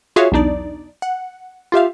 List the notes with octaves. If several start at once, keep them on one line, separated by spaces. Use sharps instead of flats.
F4 F#4 G#4 C#5 E5 F5
B1 E2 D4 D#4 D5
F#5
F4 G4 E5 F5